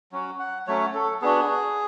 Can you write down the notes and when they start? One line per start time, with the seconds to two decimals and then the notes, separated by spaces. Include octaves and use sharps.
0.12 F#3 C#4 F#4
0.39 F#5
0.67 F#3 A3 C#4 C#5
0.95 A4
1.22 B3 D4 F#4 G#4